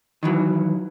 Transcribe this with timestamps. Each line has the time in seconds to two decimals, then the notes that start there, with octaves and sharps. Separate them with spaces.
0.23 D#3 E3 F#3